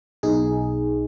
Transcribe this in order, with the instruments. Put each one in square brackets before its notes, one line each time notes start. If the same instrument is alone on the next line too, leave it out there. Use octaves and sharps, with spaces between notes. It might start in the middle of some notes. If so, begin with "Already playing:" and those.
[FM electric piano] B1 B2 D#4 G#4